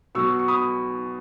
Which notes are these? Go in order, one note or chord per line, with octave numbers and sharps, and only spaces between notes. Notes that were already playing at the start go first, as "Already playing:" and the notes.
B2 F#3 C#6 E6
C#6
B5 D#6